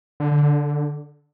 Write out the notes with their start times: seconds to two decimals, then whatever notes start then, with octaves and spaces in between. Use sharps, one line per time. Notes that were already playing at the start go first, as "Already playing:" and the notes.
0.20 D3
0.31 D3
0.43 D3